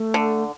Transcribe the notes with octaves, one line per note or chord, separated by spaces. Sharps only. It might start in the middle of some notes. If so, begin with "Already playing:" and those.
Already playing: A3
D3